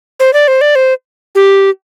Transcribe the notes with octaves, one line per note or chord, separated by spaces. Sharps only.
C5
D5
C5
D5
C5
G4